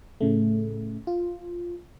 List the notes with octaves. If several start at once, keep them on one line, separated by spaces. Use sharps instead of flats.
A2 C#3 A3
F4